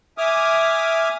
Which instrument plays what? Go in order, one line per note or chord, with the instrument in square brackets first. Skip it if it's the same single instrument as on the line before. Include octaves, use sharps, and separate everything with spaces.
[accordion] E5 G#5 D6 D#6 F6